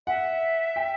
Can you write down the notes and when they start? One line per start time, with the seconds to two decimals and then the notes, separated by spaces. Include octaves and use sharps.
0.07 E5 F#5
0.76 G5